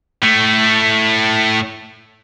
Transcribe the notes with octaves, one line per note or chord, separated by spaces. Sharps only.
A2 A3